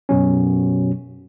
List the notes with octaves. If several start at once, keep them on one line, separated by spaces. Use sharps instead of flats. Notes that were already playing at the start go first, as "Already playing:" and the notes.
F#2 B2 F#3 C#4